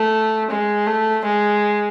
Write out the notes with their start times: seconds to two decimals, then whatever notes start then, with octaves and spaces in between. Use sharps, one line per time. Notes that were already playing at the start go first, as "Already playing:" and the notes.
Already playing: A3
0.51 G#3
0.87 A3
1.25 G#3